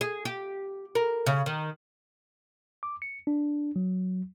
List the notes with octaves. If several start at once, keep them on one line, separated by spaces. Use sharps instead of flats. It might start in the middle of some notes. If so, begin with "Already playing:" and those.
G#4
G4
A#4
C#3
D#3
D6
C#7
D4
F#3